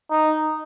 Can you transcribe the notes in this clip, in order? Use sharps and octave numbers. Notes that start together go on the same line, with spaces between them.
D#4